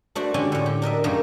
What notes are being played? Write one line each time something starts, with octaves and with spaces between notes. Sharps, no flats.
A3 D4 F#4 C5 D5
D3 G#3 C#4 F#4 G4 G#5
A2 D3
G4
D4 A#4 D#5 E5
F#2 D#3 A3 A#3 G#4 A#4